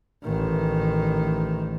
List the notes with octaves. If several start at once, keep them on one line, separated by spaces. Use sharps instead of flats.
A1 D#3